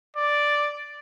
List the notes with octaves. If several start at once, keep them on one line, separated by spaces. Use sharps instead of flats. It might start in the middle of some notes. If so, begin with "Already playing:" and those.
D5